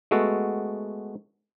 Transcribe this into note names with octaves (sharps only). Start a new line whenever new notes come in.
G#3 A3 B3 F#4 A4